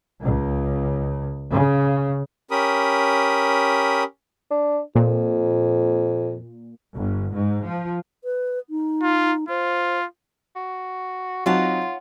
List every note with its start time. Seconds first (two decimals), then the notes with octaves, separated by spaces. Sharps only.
0.24 C#2
1.51 C#3
2.51 C#4 G4 A#4 B5 D#6
4.51 D4
4.95 F2 A#2
6.95 G1
7.33 G#2
7.65 F3
8.24 B4
8.70 D#4
9.02 F4
9.49 F4 C5
10.56 F#4
11.46 F#3 C4 D#4 F4 C#5 F#5 A5